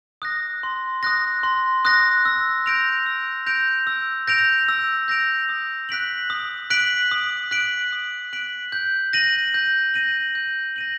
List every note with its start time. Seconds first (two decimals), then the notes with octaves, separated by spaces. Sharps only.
0.22 D#6 F#6 A#6
0.63 C6
1.03 D#6 F#6 A#6
1.43 C6
1.85 D#6 F#6 A#6
2.25 E6
2.66 G6 A#6 D7 F7
3.06 E6
3.46 G6 A#6 D7 F7
3.87 E6
4.27 G6 A#6 D7 F7
4.68 E6
5.08 G6 A#6 D7 F7
5.49 D#6
5.89 F#6 B6 D7 F#7
6.30 D#6
6.70 F#6 B6 D7 F#7
7.11 D#6
7.51 F#6 B6 D7 F#7
7.93 D#6
8.33 F#6 B6 D7 F#7
8.72 G6
9.13 A#6 D#7 F#7
9.54 G6
9.94 A#6 D#7 F#7
10.35 G6
10.76 A#6 D#7 F#7